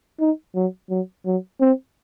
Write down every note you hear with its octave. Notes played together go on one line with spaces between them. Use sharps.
D#4
F#3
F#3
F#3
C4